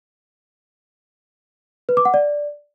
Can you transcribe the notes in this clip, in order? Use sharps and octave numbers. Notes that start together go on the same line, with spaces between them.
B4
D6
F#5
D5